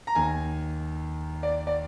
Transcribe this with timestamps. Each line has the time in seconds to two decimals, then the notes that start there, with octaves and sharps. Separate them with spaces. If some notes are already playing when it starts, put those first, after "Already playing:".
0.07 A#5
0.15 D#2 D#3 G#5
1.43 D5
1.67 D5